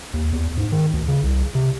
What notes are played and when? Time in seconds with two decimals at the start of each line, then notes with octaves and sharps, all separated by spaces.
0.14 D#2
0.32 E2
0.57 G#2
0.72 D#3
0.93 D2
1.08 C#3
1.23 C2
1.55 C3